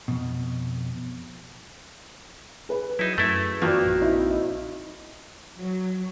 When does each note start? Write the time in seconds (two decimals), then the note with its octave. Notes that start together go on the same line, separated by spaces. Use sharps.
0.08 F2 B2
2.69 G#4 B4
2.99 F#3 D#4 E4
3.18 F#2 A3 E4
3.62 G2 D#3 F3 A#3 F#4 D5
3.85 A#1
4.02 C4 D#4 E4
5.58 F#3